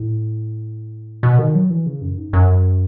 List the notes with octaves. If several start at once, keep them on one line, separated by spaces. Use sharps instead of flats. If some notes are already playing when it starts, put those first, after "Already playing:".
Already playing: A2
B2
D#3
F#3
E3
C#3
F#2
G#2
F#2